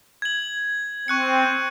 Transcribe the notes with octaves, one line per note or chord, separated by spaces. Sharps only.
G#6 F#7
C4 C#6 F#6 C#7